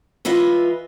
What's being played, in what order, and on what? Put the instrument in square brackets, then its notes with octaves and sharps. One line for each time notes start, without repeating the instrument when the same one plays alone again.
[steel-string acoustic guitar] E3 E4 F4 B4 D#5 E5